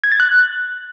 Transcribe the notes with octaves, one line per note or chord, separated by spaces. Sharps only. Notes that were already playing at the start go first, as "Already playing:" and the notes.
G#6
A6
F#6